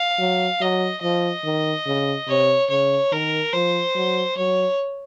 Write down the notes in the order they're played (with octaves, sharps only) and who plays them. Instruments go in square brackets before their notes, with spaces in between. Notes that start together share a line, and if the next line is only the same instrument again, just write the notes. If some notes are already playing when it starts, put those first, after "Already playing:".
Already playing: [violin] F5
[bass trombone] F#3
[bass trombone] F#3 [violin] D#5
[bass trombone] F3 [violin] D#5
[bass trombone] D#3
C#3
[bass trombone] C3 [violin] C#5
[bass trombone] C#3 [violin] C#5
[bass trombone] D#3 [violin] A#4
[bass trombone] F3 [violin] C5
[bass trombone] F#3
[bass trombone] F#3 [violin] C#5